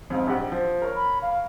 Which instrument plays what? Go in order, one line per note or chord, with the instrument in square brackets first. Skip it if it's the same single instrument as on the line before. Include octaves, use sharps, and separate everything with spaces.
[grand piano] F2 G#2 F5
A#1 G4 F#5
F3
A#4 C#5
[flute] B5
F5